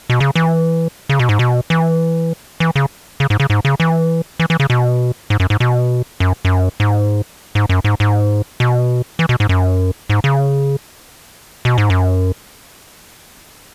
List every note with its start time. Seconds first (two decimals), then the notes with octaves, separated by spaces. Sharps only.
0.10 B2
0.20 C#3
0.36 E3
1.09 C#3
1.19 B2
1.29 G#2
1.39 B2
1.70 E3
2.60 E3
2.76 C#3
3.20 C#3
3.30 G#2
3.40 C#3
3.50 G#2
3.65 C#3
3.80 E3
4.40 E3
4.50 E3
4.60 C#3
4.70 B2
5.30 G#2
5.40 F#2
5.50 G#2
5.60 B2
6.20 F#2
6.45 F#2
6.80 G#2
7.55 G#2
7.69 F#2
7.85 G#2
8.00 G#2
8.60 B2
9.19 E3
9.29 B2
9.40 G#2
9.49 F#2
10.10 G#2
10.24 C#3
11.65 B2
11.78 G#2
11.90 F#2